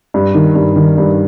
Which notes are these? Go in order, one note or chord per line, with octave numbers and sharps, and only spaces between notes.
G2
D#3
G2
D#3
G2